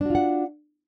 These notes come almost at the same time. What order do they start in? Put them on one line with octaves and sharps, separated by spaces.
D4 F#4 F4 F#5